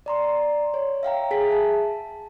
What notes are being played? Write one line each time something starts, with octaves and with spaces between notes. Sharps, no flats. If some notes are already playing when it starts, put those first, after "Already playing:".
D5 A#5 C6
C#5
E5 F5 G5 A#5
G#4 E5 G#5 B6
A5